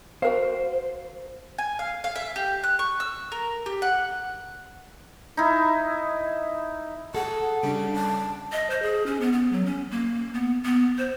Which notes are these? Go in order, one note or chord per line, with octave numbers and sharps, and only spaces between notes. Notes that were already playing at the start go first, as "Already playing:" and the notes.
F#4 A#4 C5 F5
G#5
F5
F5
E5
G4
F#6
C#6
E6
A#4
G4
F#5
D#4 E4
G#4 A4 F#5
C#3 G3 D4 D7
A5
D#5
C5
G#4
C#4
B3
B3
F#3
C#4
A#3
B3
B3
C5